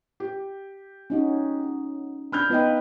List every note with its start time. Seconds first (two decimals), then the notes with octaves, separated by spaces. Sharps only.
0.20 G4
1.10 C#4 D#4 F#4
2.32 D4 B5 F6 G6
2.50 B3 D#4 F4 B4 D#5 G5